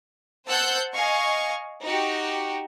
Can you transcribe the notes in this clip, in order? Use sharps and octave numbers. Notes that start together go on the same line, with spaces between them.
C5 F#5 A5 E6 F#6 G6
D#5 F5 G#5 C#6
D#4 F#4 G4